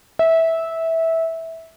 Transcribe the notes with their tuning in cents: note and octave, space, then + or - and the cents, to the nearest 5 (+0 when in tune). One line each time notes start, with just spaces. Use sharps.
E5 -15